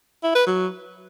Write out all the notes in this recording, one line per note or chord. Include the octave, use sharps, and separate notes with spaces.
E4
B4
F#3